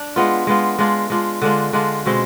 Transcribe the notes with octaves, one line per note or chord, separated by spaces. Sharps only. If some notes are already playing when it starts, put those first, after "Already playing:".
Already playing: D4
G#3 B3 F4
G#3 B3 F4
G#3 D4 F4
G#3 D4 F4
D3 G#3 D4 F4
D3 G#3 D4 F4
B2 G#3 C4